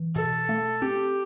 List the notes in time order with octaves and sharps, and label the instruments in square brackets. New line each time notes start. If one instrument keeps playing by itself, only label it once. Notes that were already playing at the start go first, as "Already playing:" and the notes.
Already playing: [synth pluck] E3
[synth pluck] B2 [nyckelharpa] A4
[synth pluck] A3
[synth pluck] C4 [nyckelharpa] G4